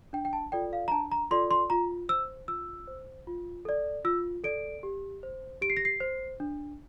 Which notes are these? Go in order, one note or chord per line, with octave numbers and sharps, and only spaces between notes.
D4 G5
G5
A5
F4 A4 D5 G5
F5
A#5
D4 A5
A#5
F4 A4 D5 C6
C6
F4 A#5
C5 E6
F4 E6
C5
F4
A4 D5
F4 E6
A4 D5 D7
G4
C5
G4 D7
C7
A#6
C7
C5
D4